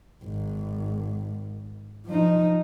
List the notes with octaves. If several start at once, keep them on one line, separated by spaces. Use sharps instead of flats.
G#1
F3 D#4